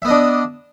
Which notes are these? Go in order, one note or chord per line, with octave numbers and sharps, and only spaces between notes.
B3 D4 D#5 E5